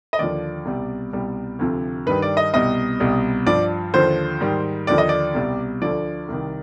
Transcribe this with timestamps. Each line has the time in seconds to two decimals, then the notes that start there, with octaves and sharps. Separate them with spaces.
0.13 D#5
0.19 D#2 D3 F3 D5
0.65 C2 B2 G3
1.13 C2 B2 G3
1.59 D2 C3 F3
2.06 G2 D#3 G3 B4
2.22 D5
2.37 D#5
2.53 C2 B2 G3 D#5
3.00 C2 B2 G3
3.46 G2 F3 D5
3.94 D#2 D3 F3 C5
4.40 G#2 D#3 G3
4.87 D#2 D3 F3 D5
4.98 D#5
5.09 D5
5.34 C2 B2 G3
5.82 D2 D3 F3 D5
6.28 C2 C3 D#3